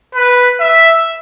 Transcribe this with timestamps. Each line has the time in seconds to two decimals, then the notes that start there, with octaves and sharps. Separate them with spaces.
0.15 B4
0.60 E5